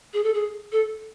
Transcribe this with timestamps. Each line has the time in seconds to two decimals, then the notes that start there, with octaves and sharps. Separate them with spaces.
0.13 G#4
0.24 A4
0.34 G#4
0.72 A4